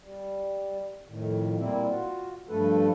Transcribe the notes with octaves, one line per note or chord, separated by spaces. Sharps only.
G3
F2 A2 D#3
A#2 G3 A#3 C4 E4
F4 F#4
G2 F3 A3 A4 B4